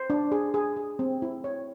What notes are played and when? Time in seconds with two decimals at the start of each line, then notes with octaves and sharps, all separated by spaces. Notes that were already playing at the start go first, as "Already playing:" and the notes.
Already playing: C5
0.10 D4
0.32 G#4
0.54 G#4
0.76 G#4
0.99 C4
1.22 E4
1.44 C#5